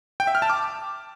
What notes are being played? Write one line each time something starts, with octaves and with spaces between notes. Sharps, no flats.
G5
E5
F6
A5
D6